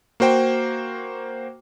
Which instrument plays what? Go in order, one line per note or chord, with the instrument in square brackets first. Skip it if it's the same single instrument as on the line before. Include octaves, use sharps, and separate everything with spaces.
[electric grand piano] A#3 F#4 C5 G5